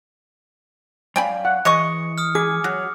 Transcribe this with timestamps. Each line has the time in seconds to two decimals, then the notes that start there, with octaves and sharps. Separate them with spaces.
1.16 F#2 D5 F5 G5 G#5 B5
1.45 F#5
1.65 E3 G#3 D#5 C#6 C#7
2.18 D#6 F6
2.35 G#4 D6
2.64 F#3 F#4